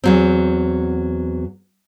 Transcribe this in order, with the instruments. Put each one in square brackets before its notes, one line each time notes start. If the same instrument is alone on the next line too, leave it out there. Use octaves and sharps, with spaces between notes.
[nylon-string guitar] E2 F#3 C4